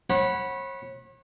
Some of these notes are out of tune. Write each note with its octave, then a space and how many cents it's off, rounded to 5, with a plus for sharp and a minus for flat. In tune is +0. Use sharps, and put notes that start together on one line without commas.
C#5 -40 F#5 +0 B5 -15